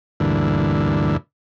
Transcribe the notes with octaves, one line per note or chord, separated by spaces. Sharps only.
D2 G2 A#2 D3 E3